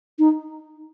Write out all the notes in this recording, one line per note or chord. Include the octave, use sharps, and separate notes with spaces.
D#4